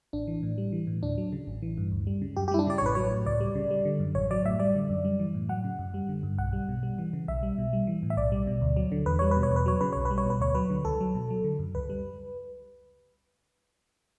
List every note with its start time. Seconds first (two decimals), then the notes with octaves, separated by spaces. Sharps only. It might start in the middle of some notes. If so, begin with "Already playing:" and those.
0.13 A1 D4
0.28 E3
0.43 A2
0.58 G3
0.72 E3
0.87 A2
1.02 D2 D4
1.18 F#3
1.32 C#3
1.47 A1
1.62 E3
1.78 G2
1.92 D2
2.07 G3
2.22 C#3
2.36 F#2 G4
2.48 G4
2.51 G3 E4
2.59 D4
2.67 C#3 D5
2.78 C#5
2.81 A1 B4
2.95 F#3 C#5
3.12 A2
3.25 C#2 D5
3.40 G3
3.55 C#3
3.71 G3
3.85 D3
4.00 F#2
4.15 A1 C#5
4.31 F#3 D5
4.45 A2 E5
4.60 G3 D5
4.75 D3
4.90 F#2
5.05 G3
5.19 E3
5.35 A2
5.49 F#3 F#5
5.64 C#3
5.79 F#2
5.94 G3
6.09 D3
6.23 G2
6.38 B1 F#5
6.53 G3
6.69 B2
6.83 G3
6.98 E3
7.13 C#3
7.28 B1 E5
7.43 G3
7.58 B2
7.73 G3
7.87 E3
8.03 A2
8.10 E5
8.17 B1 D5
8.32 G3
8.47 B2
8.61 D2
8.77 F#3
8.92 D3
9.06 E2 B4
9.19 G3 C#5
9.31 B4
9.37 B2
9.43 C#5
9.51 E2
9.56 B4
9.66 F#3 C#5
9.81 C#3 B4
9.93 B1 C#5
10.05 B4
10.11 G3
10.18 C#5
10.25 B2
10.30 B4
10.40 D2 C#5
10.55 F#3 B4
10.70 D3
10.85 C#2 A4
11.00 F#3
11.15 B2
11.30 F#3
11.44 D3
11.59 F#2
11.75 C#2 B4
11.89 G3